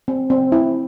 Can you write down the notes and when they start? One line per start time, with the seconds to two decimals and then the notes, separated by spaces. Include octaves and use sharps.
0.08 C4
0.30 C4
0.52 E4